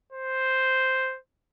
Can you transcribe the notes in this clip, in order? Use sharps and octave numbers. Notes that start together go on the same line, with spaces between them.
C5